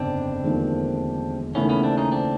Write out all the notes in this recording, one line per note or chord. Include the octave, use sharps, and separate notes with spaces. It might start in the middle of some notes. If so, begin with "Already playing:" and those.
Already playing: G1 F2 C#3 C4 D4
E1 D#2 D3 F3 A#3
D#2 C#3 E3 A3 B3 C#4
B3 C#4
C4 D4
C#4 D#4
C4 D4